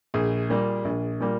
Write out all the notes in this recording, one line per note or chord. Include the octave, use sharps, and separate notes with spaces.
A#1 G#4
A#2 G3 A#3
A#1
A#2 G3 A#3